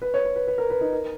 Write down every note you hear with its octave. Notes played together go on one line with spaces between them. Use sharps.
B4
C#5
B4
B4
B4
A#4
B4
D#4
A#4